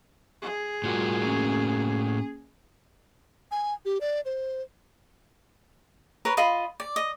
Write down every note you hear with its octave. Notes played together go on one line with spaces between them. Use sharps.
G#4
A2 G3 F4 F#4 A#4 C6
A#3 C#4
G#5
G4
D5
C5
A#4 B4 C#5
F4 D#5 B5 C6
D5
D#5